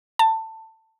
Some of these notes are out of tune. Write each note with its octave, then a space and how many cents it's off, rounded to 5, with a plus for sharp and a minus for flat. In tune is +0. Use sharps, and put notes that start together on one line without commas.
A5 +20